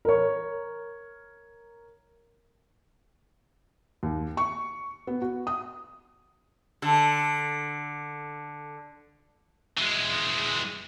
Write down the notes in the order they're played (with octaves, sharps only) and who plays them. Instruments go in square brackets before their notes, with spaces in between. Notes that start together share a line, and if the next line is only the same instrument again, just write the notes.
[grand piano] A#4 C#5
[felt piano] D#2
C#6
B3
F#4
D#6
[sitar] D3 [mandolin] A4
[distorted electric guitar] E3 G#3